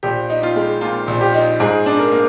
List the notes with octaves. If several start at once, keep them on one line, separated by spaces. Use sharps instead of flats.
A#1 G4
D#4
F4
G#3
A#2 F4
A#1
G4
D#4
G#2 G#4
D4
A#4
A#3